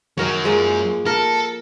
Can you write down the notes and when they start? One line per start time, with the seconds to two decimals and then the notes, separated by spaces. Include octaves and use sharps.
0.17 F#2 D#3 F#3 A#4 C#5
0.44 F3 G#3 A#3
1.06 A4 A#4